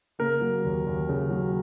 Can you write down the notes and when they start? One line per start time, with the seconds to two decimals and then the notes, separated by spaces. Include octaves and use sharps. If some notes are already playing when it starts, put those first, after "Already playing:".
0.19 C#3 A#3 A#4
0.41 F#3
0.64 D#2
0.87 D#2
1.09 C#3
1.30 F#3